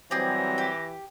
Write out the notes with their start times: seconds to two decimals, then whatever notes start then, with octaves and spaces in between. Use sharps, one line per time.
0.11 E3 F#3 G3 C4 G4 G#4 A#6
0.58 G4